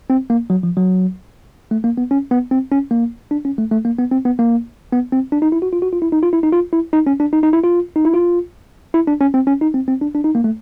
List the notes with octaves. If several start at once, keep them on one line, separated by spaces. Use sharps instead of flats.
C4
A#3
F#3
F3
F#3
A3
A#3
B3
C#4
B3
C4
C#4
A#3
D4
C#4
A3
A3
A#3
B3
C4
B3
A#3
B3
C4
D4
D#4
E4
F#4
F4
F#4
F4
E4
D#4
F4
E4
D#4
F4
E4
D#4
C#4
D4
D#4
D#4
E4
F4
D#4
E4
F4
E4
D4
C#4
C4
C#4
D#4
C4
C4
D4
D4
D#4
A#3
A3